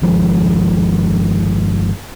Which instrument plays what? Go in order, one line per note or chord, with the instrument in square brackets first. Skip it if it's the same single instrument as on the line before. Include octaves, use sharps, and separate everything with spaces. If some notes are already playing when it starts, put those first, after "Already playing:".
[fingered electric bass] G1 D#3 F3 G#3